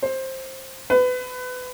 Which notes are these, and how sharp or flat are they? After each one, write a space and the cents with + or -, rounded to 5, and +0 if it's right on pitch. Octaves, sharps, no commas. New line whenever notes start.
C5 +15
B4 +25